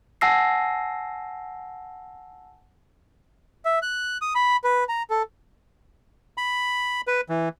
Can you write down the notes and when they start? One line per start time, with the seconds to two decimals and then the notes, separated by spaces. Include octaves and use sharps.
0.21 F#5 G#5 A5 E6 A#6 C7
3.65 E5
3.82 F#6
4.22 D#6
4.35 B5
4.64 B4
4.89 A#5
5.10 A4
6.38 B5
7.07 B4
7.29 E3